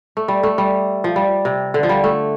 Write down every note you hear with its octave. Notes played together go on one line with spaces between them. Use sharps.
A3
G3
A3
G3
F3
G3
C3
D3
F3
G3
A3